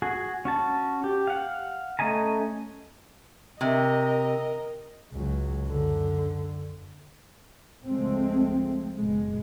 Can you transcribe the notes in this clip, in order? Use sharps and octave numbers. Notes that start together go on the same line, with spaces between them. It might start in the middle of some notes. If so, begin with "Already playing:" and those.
F#4 G#4
C#4 F#4 A5
G4
F5 F#5
A3 C#4 D#5 G#5 A#5
C3 A#4 D#5
C#2 F#3
F#2 D3
C#2 F3 G#3 A3 C4
F#1 B2 G#3